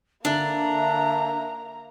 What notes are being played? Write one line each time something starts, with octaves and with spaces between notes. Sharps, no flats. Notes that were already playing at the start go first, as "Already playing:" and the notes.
D3 A#3 D4 E5 A#5